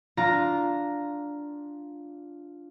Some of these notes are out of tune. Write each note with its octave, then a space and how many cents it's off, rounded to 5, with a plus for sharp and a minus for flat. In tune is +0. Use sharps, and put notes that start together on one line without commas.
D4 -5 F4 +0 A#5 +0